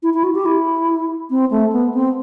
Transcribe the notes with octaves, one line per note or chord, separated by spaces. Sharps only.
E4
E4
F#4
G4
E4
C4
A3
B3
C4